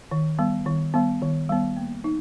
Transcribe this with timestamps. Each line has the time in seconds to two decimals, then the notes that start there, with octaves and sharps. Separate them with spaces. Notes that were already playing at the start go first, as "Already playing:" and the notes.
0.11 D#3
0.39 G3 B3
0.66 D#3
0.94 G3 B3
1.22 D#3
1.49 G3 B3
1.77 A#3
2.04 D#4